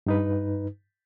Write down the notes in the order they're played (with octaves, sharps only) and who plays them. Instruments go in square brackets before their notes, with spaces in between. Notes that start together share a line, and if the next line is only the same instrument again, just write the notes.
[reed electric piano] G2 D#4 B4